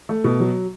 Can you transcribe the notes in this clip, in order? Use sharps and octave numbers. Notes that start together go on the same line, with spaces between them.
A3
B2
F#3